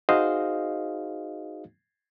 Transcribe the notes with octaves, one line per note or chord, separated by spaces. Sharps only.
D#4 F#4 G#4 C5 D#5 F5